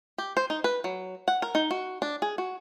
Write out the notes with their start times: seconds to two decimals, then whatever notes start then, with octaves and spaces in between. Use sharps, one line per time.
0.18 G4
0.37 C5
0.50 D#4
0.64 B4
0.84 F#3
1.28 F#5
1.42 A#4
1.55 D#4
1.71 F#4
2.02 D4
2.22 G#4
2.38 F#4